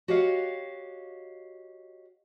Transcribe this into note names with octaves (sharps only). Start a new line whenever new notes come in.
F#4 G4 C#5 D#5 F5 F#5